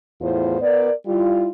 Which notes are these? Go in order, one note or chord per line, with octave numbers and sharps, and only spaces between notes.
E2 A2 B3 F4 C5
B3 A#4 D5
G3 E4 F4